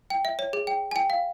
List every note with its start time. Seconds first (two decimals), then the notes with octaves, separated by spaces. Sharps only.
0.10 G5
0.25 E5
0.39 C#5
0.53 G#4
0.67 G5
0.91 G#5
0.96 G5
1.10 F5